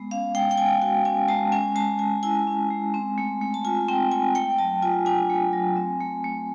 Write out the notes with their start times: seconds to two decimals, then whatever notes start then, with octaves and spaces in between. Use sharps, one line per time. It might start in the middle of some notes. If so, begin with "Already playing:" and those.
Already playing: G#3 B3
0.11 C#4 F5
0.35 G#3 G5
0.51 G5
0.58 G#3 G#5
0.81 F#4 G5
1.05 C#4 G#5
1.28 G#3 A5
1.52 C#4 G#5
1.75 G#3 A5
1.99 G#3 G#5
2.23 E4 G#5
2.47 C#4
2.70 G#3
2.94 C4
3.18 A3
3.41 A3
3.54 A5
3.64 F4 G#5
3.88 C4 G5
4.12 A3 G#5
4.35 A3 G5
4.58 F#3 A5
4.83 F4 G#5
5.06 D4 G#5
5.30 A3
5.53 F#3
5.76 C4
6.01 A3
6.24 A3